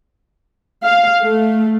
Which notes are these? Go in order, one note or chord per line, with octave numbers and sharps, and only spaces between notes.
F5
A3